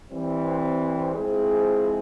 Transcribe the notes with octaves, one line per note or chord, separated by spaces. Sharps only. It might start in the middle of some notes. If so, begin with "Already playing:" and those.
E3 G3 C4
F3 G#3 C4 E4 G#4